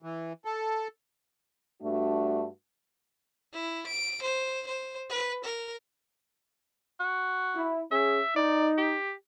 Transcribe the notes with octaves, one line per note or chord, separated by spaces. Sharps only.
E3
A4
G2 A3 D4 F#4
E4
D7
C5
C5
B4
A#4
F#4
E4
C#4 G#4 E5
D#4 D5
G4